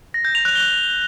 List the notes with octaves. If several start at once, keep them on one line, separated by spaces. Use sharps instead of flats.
A#6
G6
F7
F#6
G7